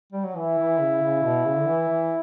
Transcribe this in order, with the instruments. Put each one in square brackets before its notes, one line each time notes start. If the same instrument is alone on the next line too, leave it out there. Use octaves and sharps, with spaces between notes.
[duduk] G3
F#3
[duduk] E3 [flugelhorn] E4
[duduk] E3
C#3
C#3
B2
C#3
D3
E3
E3